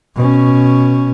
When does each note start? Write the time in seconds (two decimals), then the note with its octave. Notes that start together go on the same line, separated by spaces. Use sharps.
0.16 B2 C#4